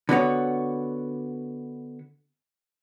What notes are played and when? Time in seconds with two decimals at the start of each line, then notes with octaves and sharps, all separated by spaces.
0.09 D3 B3 F#4 C#5